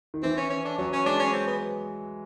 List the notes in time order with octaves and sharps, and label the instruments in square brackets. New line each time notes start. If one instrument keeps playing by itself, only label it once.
[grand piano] D#3
[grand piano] E3 [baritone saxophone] C4
[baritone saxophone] C#4
C#4
D4
[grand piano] F#3 [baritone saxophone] C#4
[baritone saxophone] C#4
[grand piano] G#3 [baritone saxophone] D4
[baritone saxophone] C#4
C4
B3